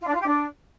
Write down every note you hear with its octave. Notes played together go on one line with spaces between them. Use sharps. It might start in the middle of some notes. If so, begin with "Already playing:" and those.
F4
D4
F4
G4
D4